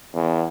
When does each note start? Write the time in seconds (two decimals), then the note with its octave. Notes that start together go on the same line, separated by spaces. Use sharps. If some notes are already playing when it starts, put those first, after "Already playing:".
0.14 E2